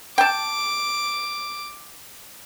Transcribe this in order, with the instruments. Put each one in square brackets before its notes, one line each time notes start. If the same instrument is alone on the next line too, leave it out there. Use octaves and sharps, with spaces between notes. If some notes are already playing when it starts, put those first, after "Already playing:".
[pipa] G5 A5 [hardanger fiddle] D6